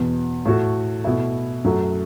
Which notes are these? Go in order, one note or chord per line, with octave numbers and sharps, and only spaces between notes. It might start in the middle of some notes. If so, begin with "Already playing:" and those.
Already playing: E2 B2 B3
A2 A3 F#4 A4
B2 A3 E4
F#2 F#3 A3 F#4